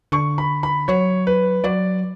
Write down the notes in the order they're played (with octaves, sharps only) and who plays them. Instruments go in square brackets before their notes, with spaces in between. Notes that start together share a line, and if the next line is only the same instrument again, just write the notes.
[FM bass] D3 [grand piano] C#6
[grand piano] B5
B5
[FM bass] F#3 [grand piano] C#5
[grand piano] B4
[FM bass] F#3 [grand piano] D5